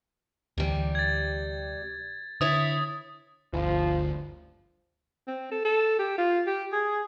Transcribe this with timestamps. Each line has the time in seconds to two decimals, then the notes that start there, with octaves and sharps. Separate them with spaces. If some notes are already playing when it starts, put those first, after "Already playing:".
0.58 D2 C3 E3 G3
0.95 G#6 A6
2.41 D3 E4 C#5 E5 D#6 A6
3.53 G1 D2 F3
5.27 C4
5.51 A4
5.65 A4
5.99 G4
6.18 F4
6.47 G4
6.73 G#4